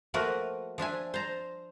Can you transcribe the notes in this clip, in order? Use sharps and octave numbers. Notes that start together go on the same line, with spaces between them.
F3 A3 A#3 F#4 A#4 B4
F3 D4 E5 G#5
C5 A5 A#5